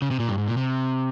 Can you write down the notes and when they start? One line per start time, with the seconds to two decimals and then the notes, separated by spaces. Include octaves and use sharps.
0.02 C#3
0.11 C3
0.20 A#2
0.29 G2
0.38 G#2
0.48 A#2
0.57 C3